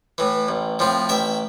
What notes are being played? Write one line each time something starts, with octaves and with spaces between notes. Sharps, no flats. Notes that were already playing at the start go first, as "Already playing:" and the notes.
A2 E3
A1
A2 F3 C4
A1 E5 G5